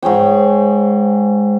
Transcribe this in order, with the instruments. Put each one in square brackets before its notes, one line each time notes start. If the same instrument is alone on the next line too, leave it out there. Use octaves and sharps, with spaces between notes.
[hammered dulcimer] G#2 G#4 C#5 G5